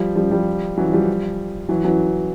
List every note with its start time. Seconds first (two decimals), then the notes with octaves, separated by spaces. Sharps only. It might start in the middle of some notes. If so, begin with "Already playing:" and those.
Already playing: F3 G3
0.16 F3 G3
0.31 F3 G3
0.77 E3 F#3
0.93 F3 G3
1.69 E3 F#3
1.84 E3 F#3